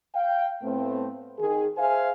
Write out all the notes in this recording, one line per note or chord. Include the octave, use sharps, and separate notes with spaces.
F5 G5
A2 A3 B3 C4
D#3 G#4
G#4 C5 E5 F5 G#5